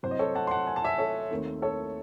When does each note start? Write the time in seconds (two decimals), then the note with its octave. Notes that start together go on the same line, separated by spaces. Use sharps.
0.03 C2 C3 F#3 C5
0.11 D#5
0.19 A4 C#5
0.35 F#5 A5
0.47 C6
0.51 F#5 A5
0.67 G#5
0.76 A5
0.85 E5 G#5
0.98 A4 C#5
1.31 D#2 D#3 A3 C4
1.62 A4 C#5